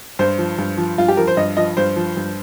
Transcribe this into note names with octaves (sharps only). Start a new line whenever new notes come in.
G2 C5
F3
G2
F3
G2 F4
G4
F3 A#4
C5
G2 D#5
F3 D#5
G2 C5
F3
G2